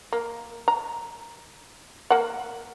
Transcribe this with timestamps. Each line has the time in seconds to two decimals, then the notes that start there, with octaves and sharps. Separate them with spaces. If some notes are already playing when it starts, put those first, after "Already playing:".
0.12 A#3
0.68 A#5
2.10 A#3 F#5